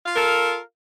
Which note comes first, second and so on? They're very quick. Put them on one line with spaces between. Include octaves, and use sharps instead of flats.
F5 F4 A#4 A4